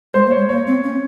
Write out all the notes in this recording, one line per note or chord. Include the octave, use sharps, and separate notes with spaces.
G#3 C5
A#3
C#5
G#3
A#3 C#5
C4
C#4